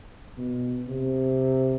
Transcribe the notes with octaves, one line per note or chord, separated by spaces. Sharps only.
B2
C3